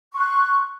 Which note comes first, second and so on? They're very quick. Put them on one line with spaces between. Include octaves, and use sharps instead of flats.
C#6 C6 F#6